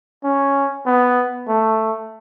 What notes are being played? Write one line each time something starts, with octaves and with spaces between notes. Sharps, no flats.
C#4
B3
A3